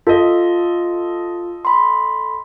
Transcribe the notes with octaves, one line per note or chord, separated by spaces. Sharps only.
F4 A4 D#5
B5 C6